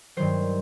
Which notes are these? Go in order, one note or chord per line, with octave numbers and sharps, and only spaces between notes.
G2 D#3 F#3 C5